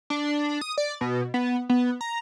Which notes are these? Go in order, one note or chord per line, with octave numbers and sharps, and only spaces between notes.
D4
D#6
D5
B2
B3
B3
A#5